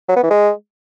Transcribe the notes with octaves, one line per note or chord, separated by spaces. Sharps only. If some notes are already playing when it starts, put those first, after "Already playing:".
F#3
B3
E3
G#3